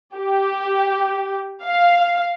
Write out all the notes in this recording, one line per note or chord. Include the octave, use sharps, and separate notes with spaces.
G4
F5